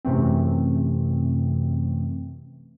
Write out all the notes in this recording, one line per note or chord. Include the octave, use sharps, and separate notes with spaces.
F#2 C3 E3 A3 C4